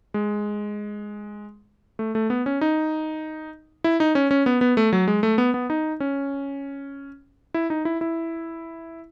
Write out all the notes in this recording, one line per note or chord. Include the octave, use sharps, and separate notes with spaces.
G#3
A3
A3
B3
C#4
D#4
E4
D#4
C#4
C#4
B3
B3
A3
F#3
G#3
A3
B3
B3
D#4
C#4
E4
D#4
E4
E4